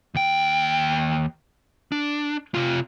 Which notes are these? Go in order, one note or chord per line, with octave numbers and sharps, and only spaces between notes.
D#2 G5
D4
C3 F4